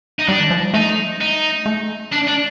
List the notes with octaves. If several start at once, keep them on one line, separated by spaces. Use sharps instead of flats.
D#4
G3 D4
D#3
F3
G3
A3 D#4
D#4
A3
D4
D4